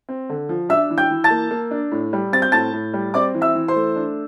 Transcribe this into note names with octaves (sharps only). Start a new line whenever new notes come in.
C4
D3
F3
D4 E5 E6
E3
G5 G6
E3
A5 A6
A#3
A#3
D4
A2
G3
C4 A6
G6
A2 A5 A6
A2
G3
C4 D5 D6
E3
E5 E6
E3
C5 C6
A3
D4